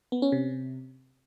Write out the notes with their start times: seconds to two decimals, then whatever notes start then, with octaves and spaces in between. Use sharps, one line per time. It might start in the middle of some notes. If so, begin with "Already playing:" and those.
0.12 B3
0.22 C#4
0.32 C3